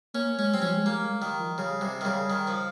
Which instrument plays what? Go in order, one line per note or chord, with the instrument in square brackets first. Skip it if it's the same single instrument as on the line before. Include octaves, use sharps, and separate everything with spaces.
[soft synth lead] A#3 [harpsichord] C#4
[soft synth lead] G#3 [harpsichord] C#4
[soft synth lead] G3 [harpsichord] C4
[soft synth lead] F3 [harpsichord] C#4
[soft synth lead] G#3
[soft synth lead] G3 [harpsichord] A#3
[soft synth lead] G#3
[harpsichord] D#3 [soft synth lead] G3
[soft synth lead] F3
[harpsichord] C#3 [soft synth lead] G3
[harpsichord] C3 [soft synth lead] G3
[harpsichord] D#3
[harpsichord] C#3 [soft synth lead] G3
[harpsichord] D#3
F3